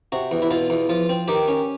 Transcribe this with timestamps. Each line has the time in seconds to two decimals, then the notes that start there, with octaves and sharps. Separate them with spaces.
0.12 C3 F#4
0.31 E2
0.42 E4
0.51 B2 F4
0.70 E2
0.89 F3 F4
1.09 C4
1.28 D#3 G4
1.48 C#4